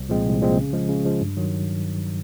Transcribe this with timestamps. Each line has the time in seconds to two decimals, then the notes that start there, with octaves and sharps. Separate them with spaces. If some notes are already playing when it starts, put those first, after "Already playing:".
Already playing: C2
0.09 A#2 F3 G#3 C4
0.25 C2
0.41 A#2 F3 G#3 C4
0.57 C#3
0.73 F3 G#3
0.89 C#3
1.05 F3 G#3
1.21 G2
1.37 D#3 F#3